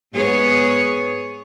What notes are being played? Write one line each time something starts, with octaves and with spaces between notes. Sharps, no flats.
G#2 B3 G#4 C#5